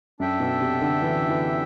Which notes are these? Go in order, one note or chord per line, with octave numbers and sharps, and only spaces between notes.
F#2 D4 A4 E5 G5
B2
C3
D3
E3
E3